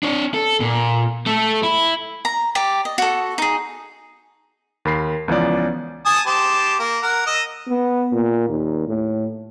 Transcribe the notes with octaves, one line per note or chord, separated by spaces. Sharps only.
D4 C#5
A4
A#2
A3 A4
E4
A#5
G4 D5
D#5
F#4 A4
D#4 G#4
D#2 A#4 B5 C7
C#2 E3 F3 B3 C#4 D5
G#5 A5 D#6
G4 C5 A5
A#3
A#4 F#5
D#5 E6
B3
A#2
D#2
A2